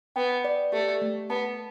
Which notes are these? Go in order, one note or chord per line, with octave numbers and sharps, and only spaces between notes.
B3 G5
D5
A3 G4
A3
B3 A5